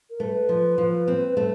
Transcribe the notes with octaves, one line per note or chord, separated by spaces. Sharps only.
A#4
A3 B4
F3
F3
C4
A3